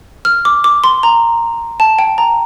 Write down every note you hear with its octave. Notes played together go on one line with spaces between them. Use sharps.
F6
D6
D6
C6
A#5
A5
G5
A#5